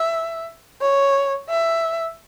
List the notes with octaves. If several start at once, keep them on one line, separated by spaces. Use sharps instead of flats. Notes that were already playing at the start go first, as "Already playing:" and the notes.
Already playing: E5
C#5
E5